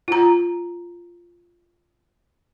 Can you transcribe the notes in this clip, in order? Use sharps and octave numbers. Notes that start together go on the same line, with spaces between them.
F4 A#5